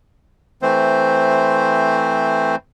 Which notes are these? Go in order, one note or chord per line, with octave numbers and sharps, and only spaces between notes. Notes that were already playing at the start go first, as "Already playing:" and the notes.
E3 A3 C4 C5